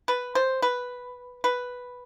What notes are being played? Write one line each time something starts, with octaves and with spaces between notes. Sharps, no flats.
B4
C5
B4
B4